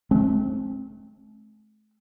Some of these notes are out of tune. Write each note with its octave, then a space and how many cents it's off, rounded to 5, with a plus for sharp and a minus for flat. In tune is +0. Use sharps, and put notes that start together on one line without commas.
A3 -45 C4 +25